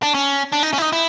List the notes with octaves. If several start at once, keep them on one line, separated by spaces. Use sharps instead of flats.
D4
C#4
D4
D#4
C#4
E4
D#4
E4